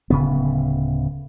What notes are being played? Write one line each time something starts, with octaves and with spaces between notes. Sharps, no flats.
D1 C#3 B3